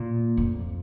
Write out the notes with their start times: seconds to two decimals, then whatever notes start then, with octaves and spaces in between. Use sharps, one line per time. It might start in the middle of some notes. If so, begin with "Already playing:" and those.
Already playing: A#2
0.37 F2